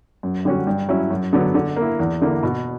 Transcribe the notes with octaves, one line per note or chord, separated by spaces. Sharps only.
F#2
D3 G3 C#4 F#4
G2
F#3 C#4 E4
F#2
D3 F#3 B3
D3
A#3
E4
E2
D3 A#3 E4
B2